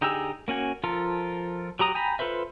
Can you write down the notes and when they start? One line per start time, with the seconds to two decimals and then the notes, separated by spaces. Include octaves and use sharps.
0.01 D3 D#4 G4 G#4 E6
0.48 A#3 C#4 F#4 G#5
0.84 F3 F4 A4 A#4
1.79 F#3 G4 A#5 D#6
1.95 G5 G#5 A#5 B5
2.19 F4 A4 B4 C5 E5